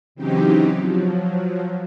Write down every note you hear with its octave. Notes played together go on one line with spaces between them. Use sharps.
C#3 E3 F#3 C4 D#4 G4
F3 F#3